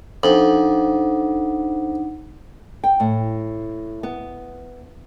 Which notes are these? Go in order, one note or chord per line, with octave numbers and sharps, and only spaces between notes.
F2 D4 D#4 F#5
G5
A2
B3